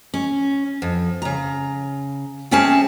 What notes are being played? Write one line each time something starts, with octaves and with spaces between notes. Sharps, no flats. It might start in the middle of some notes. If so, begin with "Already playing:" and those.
C#4
F2
C#3 A#5
G3 C4 C#4 G#4 E5 A5